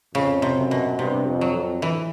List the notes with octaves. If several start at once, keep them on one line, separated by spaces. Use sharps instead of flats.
F2 C#3
C3
F#2
B2
G2 C3
F2
F#3
F2
E3